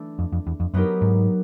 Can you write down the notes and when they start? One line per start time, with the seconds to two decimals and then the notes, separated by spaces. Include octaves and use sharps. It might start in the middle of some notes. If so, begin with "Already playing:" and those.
Already playing: E3 A3 D4
0.19 F2
0.32 F2
0.47 E2
0.60 F2
0.74 F#2 F#3 B3 D#4 G4 A#4
1.02 G#2